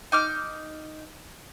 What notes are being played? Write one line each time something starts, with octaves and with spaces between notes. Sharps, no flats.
D#4 D6 F6